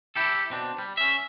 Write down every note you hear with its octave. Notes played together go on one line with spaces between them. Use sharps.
E4 G4 A4
B2 C4 D4
G3
C#4 E5